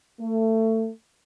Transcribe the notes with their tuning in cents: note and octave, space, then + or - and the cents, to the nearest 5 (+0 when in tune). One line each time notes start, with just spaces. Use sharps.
A3 +25